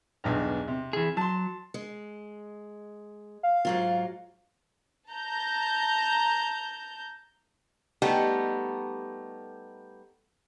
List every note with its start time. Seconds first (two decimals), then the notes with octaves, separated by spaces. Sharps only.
0.24 B1 E2 G2
0.68 C3
0.93 E3 G#4
1.17 F#3 A5 C6
1.74 G#3
3.43 F5
3.65 G#2 F#3 F4
5.10 A5 A#5 G6
8.02 G3 A3 B3 D#4 G4 A4